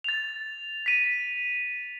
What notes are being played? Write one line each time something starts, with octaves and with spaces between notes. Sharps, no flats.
A6 F7
B6 D#7